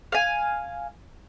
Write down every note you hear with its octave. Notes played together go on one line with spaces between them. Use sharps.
F5 G#5